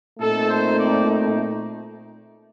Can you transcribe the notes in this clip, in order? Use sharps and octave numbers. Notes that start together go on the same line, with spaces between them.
A#2 A3 C4 D#4 A4
C5
D5